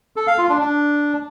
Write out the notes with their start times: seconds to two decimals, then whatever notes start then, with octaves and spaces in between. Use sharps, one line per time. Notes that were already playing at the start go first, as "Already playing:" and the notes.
0.16 A4
0.27 F5
0.38 F4
0.49 D4
0.60 D4